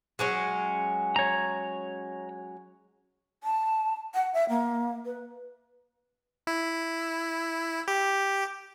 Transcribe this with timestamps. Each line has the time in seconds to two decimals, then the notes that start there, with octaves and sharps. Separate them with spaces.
0.19 F#3 G#3 C#4
1.16 C#5 A#5
3.44 A5
4.14 F#5
4.34 E5
4.49 A#3
5.06 B4
6.47 E4
7.88 G4